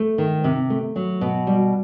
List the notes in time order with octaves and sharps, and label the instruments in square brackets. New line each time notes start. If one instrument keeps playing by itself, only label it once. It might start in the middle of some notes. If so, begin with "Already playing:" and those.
Already playing: [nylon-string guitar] A3
D#3
C3
A3
F#3
B2
G3